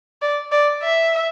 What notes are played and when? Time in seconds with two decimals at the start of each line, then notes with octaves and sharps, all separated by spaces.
0.22 D5
0.52 D5
0.83 E5